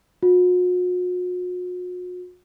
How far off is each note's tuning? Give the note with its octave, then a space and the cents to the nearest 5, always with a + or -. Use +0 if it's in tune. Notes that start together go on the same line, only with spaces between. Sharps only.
F#4 -45